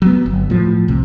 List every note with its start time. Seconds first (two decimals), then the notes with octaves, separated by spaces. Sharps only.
0.02 F#3 G3 B3
0.26 G1
0.50 A2 F3
0.88 C2 C3